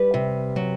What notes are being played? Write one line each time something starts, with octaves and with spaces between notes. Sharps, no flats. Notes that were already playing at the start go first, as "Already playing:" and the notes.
Already playing: G3 B4
C3
F#3